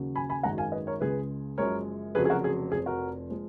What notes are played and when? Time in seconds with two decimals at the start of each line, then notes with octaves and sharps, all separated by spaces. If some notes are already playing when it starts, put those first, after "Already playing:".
Already playing: D#2 C#3 F#3
0.16 G#5 B5
0.30 G#5 B5
0.43 G#1 F#2 D#3 G#3 F#5 A#5
0.58 F5 G#5
0.72 B4 D#5
0.87 A#4 C#5
1.00 C#2 C#3 G#3 G#4 B4
1.58 F#1 F#2 F3 G#3 A#4 C#5
2.15 F1 F2 C#3 F#3 G#4 B4
2.25 G#4
2.30 F#4 A#4
2.44 G#4
2.72 F1 F2 F3 G#4
2.86 F#4 A#4
3.30 F3 G#3